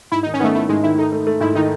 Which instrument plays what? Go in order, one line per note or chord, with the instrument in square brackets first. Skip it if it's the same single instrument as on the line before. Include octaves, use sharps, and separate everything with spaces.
[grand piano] G#2 [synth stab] E4
[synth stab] D#4
[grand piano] D#3
[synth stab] C#4
[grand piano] D#3 [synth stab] A3 B3
[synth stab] A3 [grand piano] E4
[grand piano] G#2 [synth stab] G#3
[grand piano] D#3 [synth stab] E4
[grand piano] A3 [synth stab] D#4
[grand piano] A3
A3
[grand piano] G#2 [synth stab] E4
[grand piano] D#3 [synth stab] D#4